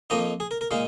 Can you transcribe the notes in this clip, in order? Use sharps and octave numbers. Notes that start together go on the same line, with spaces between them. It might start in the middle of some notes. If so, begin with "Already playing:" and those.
F2 F3 A#3 D#4 D#5
G#4
A#4
A#4
A#2 G#3 D#4 F5